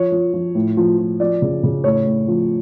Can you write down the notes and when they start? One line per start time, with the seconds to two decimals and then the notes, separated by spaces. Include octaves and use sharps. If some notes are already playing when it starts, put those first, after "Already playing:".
Already playing: F3 C#5
0.12 F3
0.34 F3
0.55 A2
0.77 F3
0.98 F3
1.20 F3 D5
1.42 C#3
1.63 C#3
1.84 A2 C#5
2.06 A2
2.28 F3